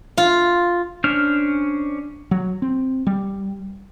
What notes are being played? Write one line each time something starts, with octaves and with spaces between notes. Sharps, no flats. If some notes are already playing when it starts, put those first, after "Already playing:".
F4
C#4 D4 C5 F6
F#3
C4
G3